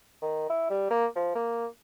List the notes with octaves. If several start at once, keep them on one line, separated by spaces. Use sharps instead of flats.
D#3
E4
G3
A#3
F3
A#3